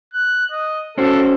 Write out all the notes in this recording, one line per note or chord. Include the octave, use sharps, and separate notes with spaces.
F#6
D#5
C#4 F#4 A4 C5